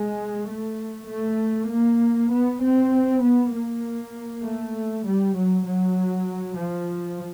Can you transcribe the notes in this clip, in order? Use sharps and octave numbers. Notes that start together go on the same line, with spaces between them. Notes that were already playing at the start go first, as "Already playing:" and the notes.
Already playing: G#3
A3
A3
A#3
B3
C4
B3
A#3
A3
G3
F#3
F#3
F3